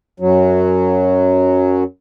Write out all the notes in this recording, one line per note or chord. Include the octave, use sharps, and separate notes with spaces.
F#2 F#3